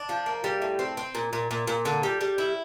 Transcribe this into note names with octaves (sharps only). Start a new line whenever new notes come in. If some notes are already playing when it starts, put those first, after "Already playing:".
Already playing: D4
F3
A#3
G3
A2
C4
C4
A#2
A#2
A#2
A#2
D3
G3
G3
E4